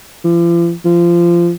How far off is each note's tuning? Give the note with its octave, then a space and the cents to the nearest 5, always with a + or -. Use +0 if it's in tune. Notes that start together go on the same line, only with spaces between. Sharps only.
F3 -45
F3 -20